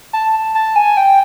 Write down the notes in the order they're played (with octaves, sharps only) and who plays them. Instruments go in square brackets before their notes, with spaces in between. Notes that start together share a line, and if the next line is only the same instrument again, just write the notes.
[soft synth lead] A5
A5
G#5
G5